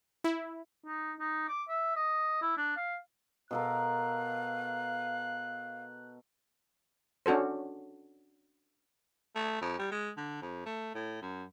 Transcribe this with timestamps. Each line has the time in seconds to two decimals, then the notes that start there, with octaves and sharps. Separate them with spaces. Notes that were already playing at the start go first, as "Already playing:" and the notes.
0.24 E4
0.86 D#4
1.20 D#4
1.48 D6
1.69 E5
1.96 D#5
2.42 E4
2.57 D4
2.77 F5
3.51 B2 A4 A#4 F5 F#6
7.26 C#4 D4 F#4 A4 C5
9.35 A3
9.61 F2
9.79 G3
9.92 G#3
10.17 D3
10.42 F2
10.66 A3
10.95 A2
11.22 F#2